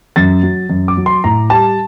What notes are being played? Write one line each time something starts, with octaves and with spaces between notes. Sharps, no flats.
F#2 A6
F#3
F#2
D6
F#3
C6
A2 A#5
G3 A5